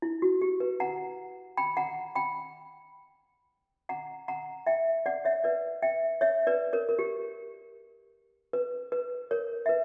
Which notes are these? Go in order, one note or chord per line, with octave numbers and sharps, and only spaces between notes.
E4
F#4
G4
B4
F#5 A#5
G5 B5
F#5 A#5
G5 B5
F#5 A#5
F#5 A#5
E5 G5
D5 F#5
C#5 E5
B4 D5
E5 G5
C#5 E5
B4 D5
A#4 C#5
A#4
G4
B4
B4
A#4 C#5
E5
B4